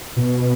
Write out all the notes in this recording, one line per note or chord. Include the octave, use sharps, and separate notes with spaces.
B2